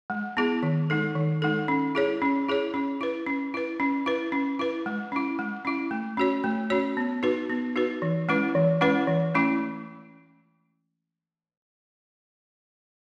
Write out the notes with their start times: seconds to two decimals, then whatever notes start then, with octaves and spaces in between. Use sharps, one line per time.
0.10 G#3
0.37 B3 E4 G#4
0.63 D#3
0.90 G#3 D#4 A4
1.15 D#3
1.42 G#3 D#4 A4
1.68 C#4
1.95 E4 G#4 C#5
2.22 C#4
2.48 E4 G#4 C#5
2.74 C#4
3.01 E4 B4
3.26 C#4
3.54 E4 B4
3.80 C#4
4.06 E4 B4
4.32 C#4
4.59 E4 B4
4.86 G#3
5.12 C#4 E4
5.39 G#3
5.65 C#4 E4
5.91 A3
6.17 C#4 F#4 C#5
6.44 A3
6.70 C#4 F#4 C#5
6.97 B3
7.23 D#4 F#4 B4
7.50 B3
7.76 D#4 F#4 B4
8.02 E3
8.29 G#3 C#4 E4 B4
8.55 E3
8.81 G#3 C#4 E4 B4
9.07 E3
9.35 A3 C#4 E4